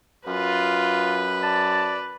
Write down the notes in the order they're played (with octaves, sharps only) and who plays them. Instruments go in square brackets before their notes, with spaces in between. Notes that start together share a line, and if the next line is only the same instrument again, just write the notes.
[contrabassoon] F#2 [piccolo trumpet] F4 [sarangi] B4
[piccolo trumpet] D5 [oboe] A5